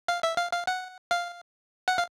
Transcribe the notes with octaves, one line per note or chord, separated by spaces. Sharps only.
F5
E5
F5
F5
F#5
F5
F#5
F5